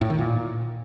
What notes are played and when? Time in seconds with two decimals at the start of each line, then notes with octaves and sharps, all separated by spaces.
0.01 A2
0.10 D#3
0.19 A#2